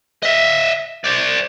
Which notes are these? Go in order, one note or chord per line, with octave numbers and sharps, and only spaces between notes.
D#5 E5
C5 D5